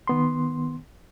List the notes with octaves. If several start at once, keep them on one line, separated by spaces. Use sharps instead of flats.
D#3 B3 C6